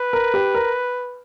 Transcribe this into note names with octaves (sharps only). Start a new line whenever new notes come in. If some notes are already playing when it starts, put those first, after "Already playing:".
Already playing: B4
A#4
G4
A#4